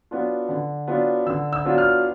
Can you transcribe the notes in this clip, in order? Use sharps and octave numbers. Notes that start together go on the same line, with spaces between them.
F#3 B3 D4 F4
D3
F#3 B3 D4 F4
D3 E6
E6
F#3 B3 D4 F4
F6